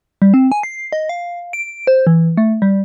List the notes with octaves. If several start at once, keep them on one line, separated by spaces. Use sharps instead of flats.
G3
C4
G#5
C7
D#5
F5
D7
C5
E3
A3
G3